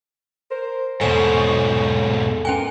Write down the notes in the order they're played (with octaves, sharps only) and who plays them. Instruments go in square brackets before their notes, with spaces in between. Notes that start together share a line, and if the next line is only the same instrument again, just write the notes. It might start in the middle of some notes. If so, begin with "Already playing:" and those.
[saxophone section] A#4 C5
[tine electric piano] E2 A4 [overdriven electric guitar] G#2 B2 [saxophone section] D#4 C5 C#5 [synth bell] G#5
[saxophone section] A#3 D4 A#4 [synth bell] C#4 G5 G#5